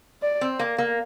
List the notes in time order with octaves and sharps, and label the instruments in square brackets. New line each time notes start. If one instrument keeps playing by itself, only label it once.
[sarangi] D5
[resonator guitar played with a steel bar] C4
A#3
A#3